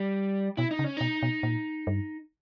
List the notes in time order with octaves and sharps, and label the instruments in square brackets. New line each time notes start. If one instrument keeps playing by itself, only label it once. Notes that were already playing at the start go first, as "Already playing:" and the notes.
Already playing: [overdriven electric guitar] G3
[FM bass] B2 [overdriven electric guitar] E4
[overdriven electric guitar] D#4
[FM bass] C#3
[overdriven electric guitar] C#4
[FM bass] B2 [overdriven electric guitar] D#4
[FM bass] B2
A#2
G2